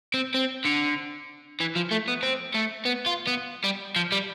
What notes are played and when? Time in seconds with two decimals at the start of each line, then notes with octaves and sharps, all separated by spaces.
0.14 C4
0.35 C4
0.66 D3
1.60 E3
1.75 F3
1.91 A3
2.08 B3
2.23 C4
2.54 A3
2.85 B3
3.06 F4
3.27 B3
3.64 G3
3.96 F3
4.12 G3